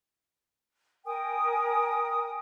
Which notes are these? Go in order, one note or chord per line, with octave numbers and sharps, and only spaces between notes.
A#4 G5 G#5 D#6